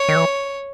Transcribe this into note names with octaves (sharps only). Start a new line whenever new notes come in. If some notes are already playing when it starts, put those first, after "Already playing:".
Already playing: C#5
D#3
E3